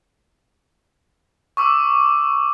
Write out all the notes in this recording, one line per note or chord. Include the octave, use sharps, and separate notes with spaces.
C#6 D6 E6